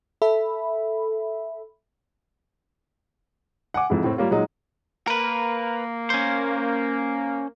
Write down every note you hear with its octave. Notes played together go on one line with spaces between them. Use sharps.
A4 E5 B5
F#5 G#5 D6
F2 G#2 E4
A2 C4
G3 A#3 F4 C#5
A#2 F#3 G#3 D#4
A#3 A#4 B4
C#4 C5